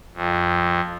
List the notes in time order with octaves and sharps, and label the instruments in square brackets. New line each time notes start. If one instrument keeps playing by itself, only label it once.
[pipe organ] F2